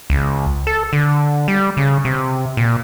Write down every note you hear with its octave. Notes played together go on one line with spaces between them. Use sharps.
C#2
A4
D3
G3
C#3
C3
A#2